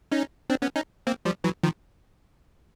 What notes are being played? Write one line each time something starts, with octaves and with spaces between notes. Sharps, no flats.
C#4 D#4
C4 D4
B3 C#4
C#4 D#4
A#3 C4
F3 G3
E3 F#3
D#3 F3